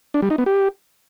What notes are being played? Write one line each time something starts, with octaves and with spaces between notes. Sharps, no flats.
D4
G3
D#4
B3
G4